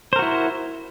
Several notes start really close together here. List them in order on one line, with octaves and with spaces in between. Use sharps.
C5 A#4 F#4 E4